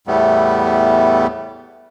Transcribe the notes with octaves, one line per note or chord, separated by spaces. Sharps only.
E2 A2 G3 A3 B3